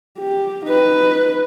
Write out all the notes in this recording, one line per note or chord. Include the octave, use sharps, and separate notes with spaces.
G4
D#4 B4